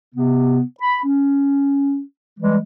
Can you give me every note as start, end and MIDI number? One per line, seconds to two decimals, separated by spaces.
0.15 0.61 48
0.15 0.61 59
0.81 0.99 83
1.04 2.01 61
2.39 2.57 52
2.39 2.57 55
2.39 2.57 56